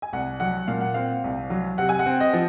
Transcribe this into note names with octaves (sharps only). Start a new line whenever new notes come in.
G#5
C2 F#5
F#3 F#5
A#2 F5
F#5
C4 F5
C2
F#3
C3 F#5
G#5
F#5
C4
D#5
F3